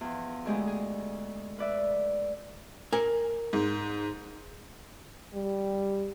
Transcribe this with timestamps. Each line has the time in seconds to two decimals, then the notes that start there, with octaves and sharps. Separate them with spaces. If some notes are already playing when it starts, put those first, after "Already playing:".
0.01 E2 F3
0.46 D2 G#3 G4 G#4
0.67 G#4
1.58 B4 D5 E5
2.93 A#4 G#5
3.53 G#2
5.35 G3